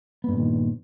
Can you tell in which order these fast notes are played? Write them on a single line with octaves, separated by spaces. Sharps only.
B3 G2 A#2 D#3